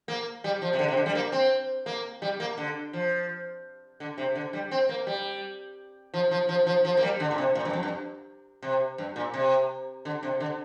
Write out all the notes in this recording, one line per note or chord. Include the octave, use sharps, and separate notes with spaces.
A#3
G3
F3
C3
D3
C3
D3
G3
A#3
C4
A#3
G3
A#3
D3
F3
D3
C3
D3
G3
C4
A#3
G3
F3
F3
F3
F3
F3
A#3
G3
D3
A#2
C3
A#2
G2
F2
G2
C3
G2
A#2
C3
D3
C3
D3